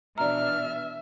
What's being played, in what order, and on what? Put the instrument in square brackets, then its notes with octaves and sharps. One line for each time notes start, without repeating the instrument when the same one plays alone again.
[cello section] B2 E3 D4 [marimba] D5 A#5 [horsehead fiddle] E5 [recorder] F6